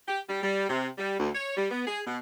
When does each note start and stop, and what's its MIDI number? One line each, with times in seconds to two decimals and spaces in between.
0.08 0.21 67
0.29 0.39 55
0.43 0.65 55
0.70 0.89 48
0.98 1.16 55
1.19 1.30 38
1.35 1.56 73
1.57 1.70 55
1.71 1.83 59
1.87 2.00 68
2.07 2.18 47